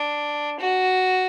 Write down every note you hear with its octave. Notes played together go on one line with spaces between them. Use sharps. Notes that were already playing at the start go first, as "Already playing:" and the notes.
Already playing: D4
F#4